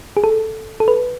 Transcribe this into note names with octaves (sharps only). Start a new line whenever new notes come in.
G#4
A4
A4
B4